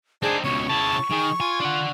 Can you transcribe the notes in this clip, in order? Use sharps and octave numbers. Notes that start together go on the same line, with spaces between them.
C4 D4 D#4 G#4
C#2 B2 C#5 C#6
C#3 E4 A5
D#3 G#4
F4 G#5
D4 F#5